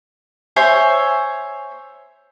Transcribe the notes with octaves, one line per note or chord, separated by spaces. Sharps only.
C5 C#5 E5 G#5